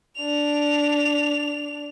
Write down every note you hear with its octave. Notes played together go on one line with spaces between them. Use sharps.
D4 F7